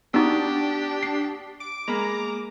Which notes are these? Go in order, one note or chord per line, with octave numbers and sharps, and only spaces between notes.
B3 D4 D#4 F#4 G4 C#6 D#6
C7
D6 D7
G#3 A#3 A#5 B5